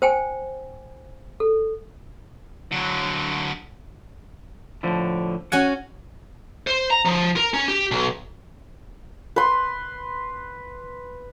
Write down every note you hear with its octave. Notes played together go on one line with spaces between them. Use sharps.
C5 G5 G#5
A4
D3 F#3
A2 D3 F3
C#4 F#4 F#5 G#5
C5
A#5
F3
A#4
C#4
G4
B1
B4 C6